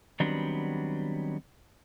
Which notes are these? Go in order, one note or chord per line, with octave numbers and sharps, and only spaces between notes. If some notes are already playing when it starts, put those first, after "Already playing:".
D#3 F#3 G3 B3 C4 D4